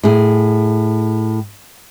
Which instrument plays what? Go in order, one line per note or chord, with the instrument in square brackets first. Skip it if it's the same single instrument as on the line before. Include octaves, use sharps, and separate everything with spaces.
[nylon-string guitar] A2 G#4